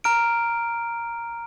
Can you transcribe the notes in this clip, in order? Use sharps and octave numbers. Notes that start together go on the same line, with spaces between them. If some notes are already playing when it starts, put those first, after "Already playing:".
A#5 F6 D7